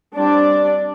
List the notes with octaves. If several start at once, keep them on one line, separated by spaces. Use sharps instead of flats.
G3 C4 D4 D5